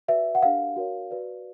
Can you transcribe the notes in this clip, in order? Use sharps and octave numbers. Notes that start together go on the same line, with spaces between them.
F#4 B4 D5 E5
F#5
D4 G4 A#4 F5
F#4 A#4 C#5
F#4 B4 D5